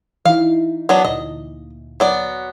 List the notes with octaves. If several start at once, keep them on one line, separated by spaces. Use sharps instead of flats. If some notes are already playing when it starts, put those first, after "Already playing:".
E3 D#4 E4 F5
F#3 B3 D4
D2 A#2 D#5
F#3 B3 D5